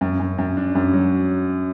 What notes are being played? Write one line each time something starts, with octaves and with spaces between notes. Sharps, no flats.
F#2
F#2
F#2
D4
F#2
F#3